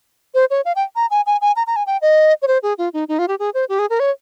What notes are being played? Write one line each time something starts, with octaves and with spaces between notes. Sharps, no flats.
C5
C#5
F5
G5
A#5
G#5
G#5
G#5
A#5
A#5
G#5
G5
D#5
C#5
C5
G#4
F4
D#4
D#4
F4
G4
G#4
C5
G4
G#4
A#4
C#5